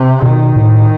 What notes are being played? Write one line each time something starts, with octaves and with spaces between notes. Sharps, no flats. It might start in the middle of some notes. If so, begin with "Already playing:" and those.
Already playing: C3
B2 D#3
A2